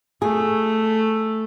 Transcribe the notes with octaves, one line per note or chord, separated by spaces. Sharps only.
A3 G#4